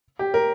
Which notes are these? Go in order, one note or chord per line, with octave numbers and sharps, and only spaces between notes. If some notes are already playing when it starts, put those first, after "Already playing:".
G4
A#4